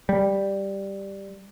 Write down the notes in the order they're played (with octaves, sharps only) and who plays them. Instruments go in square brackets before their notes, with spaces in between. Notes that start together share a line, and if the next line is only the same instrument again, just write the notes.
[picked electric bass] G3